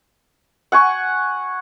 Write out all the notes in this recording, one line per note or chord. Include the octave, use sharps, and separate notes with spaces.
F#5 G#5 C#6